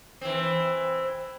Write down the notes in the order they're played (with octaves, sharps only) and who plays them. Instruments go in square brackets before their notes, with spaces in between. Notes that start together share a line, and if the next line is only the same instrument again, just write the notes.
[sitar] E3 C4